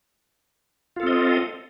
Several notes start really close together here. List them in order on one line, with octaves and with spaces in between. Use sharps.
F4 A4 C4 D#5